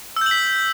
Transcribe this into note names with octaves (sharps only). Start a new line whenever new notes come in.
E6 G6 B6 F#7